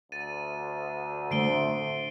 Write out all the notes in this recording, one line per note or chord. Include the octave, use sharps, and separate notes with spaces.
D2 A6 D#7
D3 A3 C5 C7 D7 G7